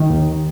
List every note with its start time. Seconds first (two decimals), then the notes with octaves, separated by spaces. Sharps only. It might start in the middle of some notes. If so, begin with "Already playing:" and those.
Already playing: D#3
0.10 D#2